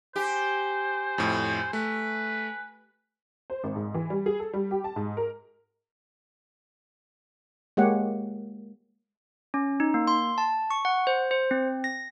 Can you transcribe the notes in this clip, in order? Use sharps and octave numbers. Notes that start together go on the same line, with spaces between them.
G4 C5 G#5
F2 A2
A3 B4
C5
G#1
G#2
E3
G3
G#4
A4
G3
G4
A5
G#2
A#4
G#3 A#3 G4 C#5 F#5
C#4
D#4
A#3
C6
A5
C#6
F#5
C5
C5
C4
A#6